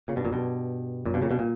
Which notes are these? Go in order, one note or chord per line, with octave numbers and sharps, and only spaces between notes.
A#2 C#3
G2 B2
F#2 A#2
G2 B2
F#2 A#2
G2 B2
A#2 C#3
G2 B2
A#2